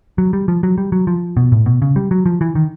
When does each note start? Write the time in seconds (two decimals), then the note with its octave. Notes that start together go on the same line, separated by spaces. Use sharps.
0.18 F#3
0.33 G3
0.48 F3
0.63 F#3
0.78 G3
0.92 F#3
1.07 F3
1.37 B2
1.52 A2
1.66 B2
1.82 C#3
1.96 G3
2.11 F#3
2.26 F3
2.41 E3
2.55 D#3